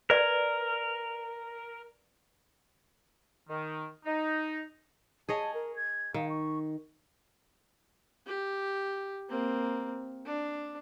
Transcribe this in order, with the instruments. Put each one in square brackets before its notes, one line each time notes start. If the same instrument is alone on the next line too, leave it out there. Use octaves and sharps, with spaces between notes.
[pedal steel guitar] A#4 [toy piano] B4 D5
[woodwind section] D#3
D#4
[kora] G#4 C#5 D#5 [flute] A5
[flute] A#4
G#6
[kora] D#3 [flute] F5
[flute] C#6
[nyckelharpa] G4
A#3 C4
D4